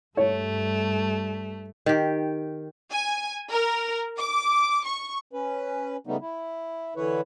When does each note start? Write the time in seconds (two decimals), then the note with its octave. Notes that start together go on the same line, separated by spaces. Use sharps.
0.17 G2 G3 A3 C#5
1.86 D#3 G4
2.92 G#5
3.51 A#4
4.18 D6
4.86 C#6
5.33 C#4 B4
6.07 C#3 G3 A3 B3 D#4
6.21 E4
6.96 D3 E3 E4 B4 C#5